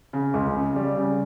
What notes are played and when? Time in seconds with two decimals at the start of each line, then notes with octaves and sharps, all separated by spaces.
0.13 C#3
0.34 C#2
0.55 C#3
0.76 G3
0.96 C#3